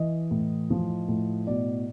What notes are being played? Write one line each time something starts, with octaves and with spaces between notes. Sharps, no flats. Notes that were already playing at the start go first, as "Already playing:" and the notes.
Already playing: E3 D#5
A2
F3
A2
B2 D5